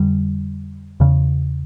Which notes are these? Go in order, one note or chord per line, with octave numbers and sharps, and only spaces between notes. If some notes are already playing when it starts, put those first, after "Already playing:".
Already playing: F2 D3 G3
E2 C#3